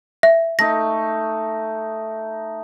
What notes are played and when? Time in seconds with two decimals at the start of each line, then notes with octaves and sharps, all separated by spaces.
0.23 E5
0.59 A3 D#4 A#6